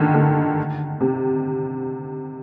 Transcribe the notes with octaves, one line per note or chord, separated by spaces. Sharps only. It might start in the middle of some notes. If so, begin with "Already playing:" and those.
Already playing: D3 D#3
D3
C3